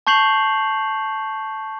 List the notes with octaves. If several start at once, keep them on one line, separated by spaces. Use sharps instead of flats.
A5 C#6 G6 C7 F7 F#7